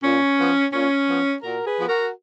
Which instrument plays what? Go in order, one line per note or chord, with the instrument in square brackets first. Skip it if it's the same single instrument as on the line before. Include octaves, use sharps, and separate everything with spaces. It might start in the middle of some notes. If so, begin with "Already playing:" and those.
[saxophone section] A#2 C#4
F3 B3
A#2 C#4
F3 B3
A#2 F#4 A#4
G#4 B4
F3 B3
F#4 A#4